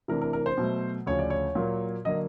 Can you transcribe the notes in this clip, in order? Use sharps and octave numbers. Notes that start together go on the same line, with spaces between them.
C3 E3 A3 D4 A#4
A#4
A#4
C5
B2 F#3 A3
D2 C#3 F3 C#5
D5
C#5
A#2 F#3 A#3
D3 F#3 A#3 D#5